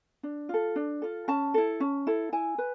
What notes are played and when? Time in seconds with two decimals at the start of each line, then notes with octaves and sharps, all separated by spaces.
0.23 D4
0.49 F4 A4
0.76 D4
1.02 F4 A4
1.28 C#4 A5
1.54 E4 A4
1.80 C#4
2.07 E4 A4
2.33 E4 G#5
2.58 B4